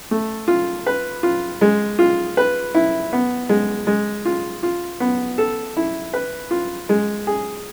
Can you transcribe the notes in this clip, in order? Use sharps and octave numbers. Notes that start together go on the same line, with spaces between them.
A3
F4
B4
F4
G#3
F4
B4
E4
B3
G#3
G#3
F4
F4
B3
A4
E4
B4
F4
G#3
G#4